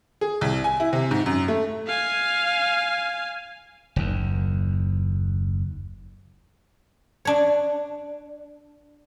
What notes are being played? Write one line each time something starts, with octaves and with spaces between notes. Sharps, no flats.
G#4
C2
G#5
E4
C3
G#2
F#2
A3
F5 G#5
F#1 D#2
D4 C#5